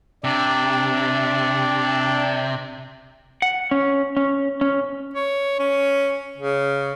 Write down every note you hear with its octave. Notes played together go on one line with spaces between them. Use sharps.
C3 D4
F#5
C#4
C#4
C#4
C#5
C#4
C#3